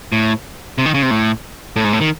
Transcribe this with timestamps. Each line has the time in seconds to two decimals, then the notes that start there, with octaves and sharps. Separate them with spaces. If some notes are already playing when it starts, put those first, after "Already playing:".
0.12 A2
0.78 C3
0.86 D#3
0.94 C#3
1.02 C3
1.11 A2
1.76 A2
1.84 G#2
1.93 A2
2.01 D#3